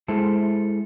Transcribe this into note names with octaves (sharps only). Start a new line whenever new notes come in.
G#3 E4 G#4 A4 C5 E5